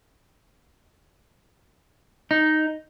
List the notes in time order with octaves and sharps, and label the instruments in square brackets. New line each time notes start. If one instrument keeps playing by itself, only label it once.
[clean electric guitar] D#4